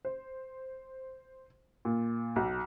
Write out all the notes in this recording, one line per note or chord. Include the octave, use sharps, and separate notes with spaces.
C5
A#2
B1